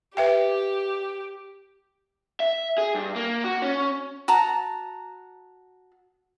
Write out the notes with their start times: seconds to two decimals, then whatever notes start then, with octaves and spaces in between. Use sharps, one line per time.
0.17 G4 B4 E5 G5
2.40 E5
2.78 G#4
2.95 G2
3.16 A#3
3.44 F#4
3.62 C#4
4.28 F#4 A5 A#5